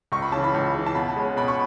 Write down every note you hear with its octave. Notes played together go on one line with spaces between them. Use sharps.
C#2 C#6
B5
C#3 E3 A5
B5
C#2
C#3 E3
A5
B2 B5
G#3 C#4
B2 B5
C#6